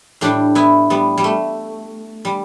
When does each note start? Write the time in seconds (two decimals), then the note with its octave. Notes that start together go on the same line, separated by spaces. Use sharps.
0.21 A2 G3 D4 G4
0.55 B3 E4
0.90 G3 B3
1.18 G3
1.24 A3
2.25 G3